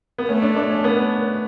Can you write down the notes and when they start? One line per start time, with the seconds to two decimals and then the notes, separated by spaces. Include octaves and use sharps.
0.18 B3
0.29 A3 C#4
0.42 D4
0.56 D4
0.70 C#4
0.84 B3